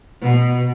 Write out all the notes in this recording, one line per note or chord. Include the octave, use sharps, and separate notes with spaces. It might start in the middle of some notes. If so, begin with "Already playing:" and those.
B2